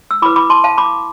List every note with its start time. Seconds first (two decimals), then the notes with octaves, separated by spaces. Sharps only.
0.11 E6
0.22 E4 B5 D6
0.26 B4
0.36 B5 D6
0.50 A5 C6
0.64 F5 A5
0.77 B5 D6